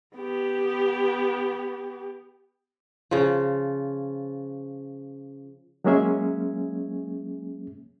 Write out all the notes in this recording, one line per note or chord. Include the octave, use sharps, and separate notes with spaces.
B3 G4
C#3 F3
F#3 G#3 A#3 C#4 G#4 E5